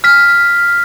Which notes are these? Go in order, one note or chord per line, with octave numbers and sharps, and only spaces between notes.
F6 B6